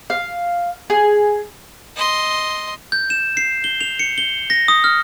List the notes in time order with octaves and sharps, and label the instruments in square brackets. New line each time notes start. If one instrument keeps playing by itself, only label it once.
[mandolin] F5
G#4
[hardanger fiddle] D#5 C6
[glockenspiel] G6
E7
C7
G7
F7
C#7
G7
A#6
D#6
F6